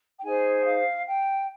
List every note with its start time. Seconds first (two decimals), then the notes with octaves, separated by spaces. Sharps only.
0.18 G5
0.23 D#4 G#4 C5 G#5
0.65 F5
1.07 G5